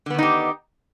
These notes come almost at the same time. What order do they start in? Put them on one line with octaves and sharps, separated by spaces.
D3 B3 D#3 D#4 G4